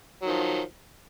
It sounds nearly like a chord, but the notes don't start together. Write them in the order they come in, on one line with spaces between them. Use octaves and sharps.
F#3 D#3 F3